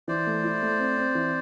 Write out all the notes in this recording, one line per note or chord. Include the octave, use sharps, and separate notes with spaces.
E3 C5 D5
A3
E4
A3
C4
C4
E3